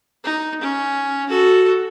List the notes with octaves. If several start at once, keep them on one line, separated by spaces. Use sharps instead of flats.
D#4
C#4
F#4 A4